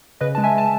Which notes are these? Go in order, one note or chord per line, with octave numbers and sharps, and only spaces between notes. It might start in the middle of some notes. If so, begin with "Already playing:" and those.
C#3 B4 D#5
G#3 A5
E5 G#5
G#3 A5